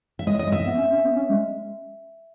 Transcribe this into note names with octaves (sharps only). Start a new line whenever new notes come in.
E5
G#3 D#5
D#5
G#3
E5
B3
C#4
C#4
B3
C#4
G#3